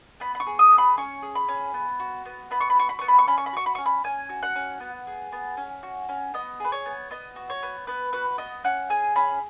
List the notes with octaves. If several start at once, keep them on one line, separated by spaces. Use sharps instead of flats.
B3 B5
B5
C#6
G#4
D#6
B3
B5
C#4 C#6
G#4
B5
C#4
B3
F#4
B3
B3 B5
C#6
B5
F#4 C#6
B5
B3 C#6
B5
C#6
C#4 B5
C#6
B5
F#4 C#6
B5
C#4 C#6
B5
C#4 G#5
F#4
F#5
C#4
B3
G#4
B3
C#4
F#4
C#4
B3 D#5
G#4 B4
C#5
B3
B3 D#5
F#4
C#5
B3
B3 B4
F#4 B4
B3 D#5
C#4 F#5
G#4 G#5
C#4 B5